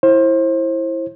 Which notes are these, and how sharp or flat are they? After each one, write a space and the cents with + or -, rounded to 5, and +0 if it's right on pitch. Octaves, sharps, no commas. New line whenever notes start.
E4 +0 C5 +30